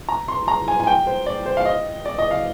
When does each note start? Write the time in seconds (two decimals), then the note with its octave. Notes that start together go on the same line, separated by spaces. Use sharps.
0.09 A#5
0.28 C6
0.48 A#5
0.68 G#5
0.80 G#5
0.87 G5
1.07 C5
1.26 D5
1.46 C5
1.57 F5
1.65 D#5
2.05 D5
2.18 D#5
2.31 F5